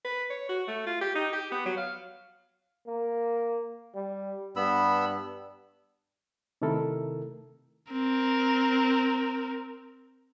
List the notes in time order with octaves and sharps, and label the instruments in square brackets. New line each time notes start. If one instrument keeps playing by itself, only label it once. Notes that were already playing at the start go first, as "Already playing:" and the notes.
[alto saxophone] B4
C#5
F#4
A3
F4
G4
D#4
G4
B3
F#3
F5
[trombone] A#3
G3
[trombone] G2 [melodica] B3 B5 E6
[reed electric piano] C3 D#3 A3 E4 A4 A#4
[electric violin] C4 A#4